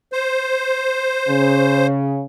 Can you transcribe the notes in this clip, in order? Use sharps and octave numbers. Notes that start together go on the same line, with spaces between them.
C5
C#3